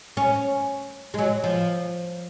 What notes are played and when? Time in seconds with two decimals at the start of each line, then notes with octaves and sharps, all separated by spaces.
0.17 C#4
1.14 G#3
1.18 F#3
1.44 F3